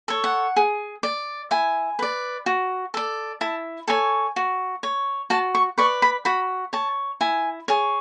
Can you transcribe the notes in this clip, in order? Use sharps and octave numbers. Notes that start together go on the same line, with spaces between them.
A4 C#5
F#5
G#4
D5
E4 G#5
B4 D5
F#4
A4 D5
E4 A5
A4 C#5 G#5
F#4
C#5
F#4 A5
C#6
B4 D5 C#6
B5
F#4 B5
C#5 A5
E4 G#5
G#4 C#5